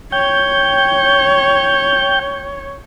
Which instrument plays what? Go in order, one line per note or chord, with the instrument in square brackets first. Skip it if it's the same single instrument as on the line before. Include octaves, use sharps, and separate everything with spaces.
[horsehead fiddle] C#5 [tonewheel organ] G5 G6